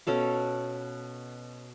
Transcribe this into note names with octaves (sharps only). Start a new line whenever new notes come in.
B2 C#4 A4 F5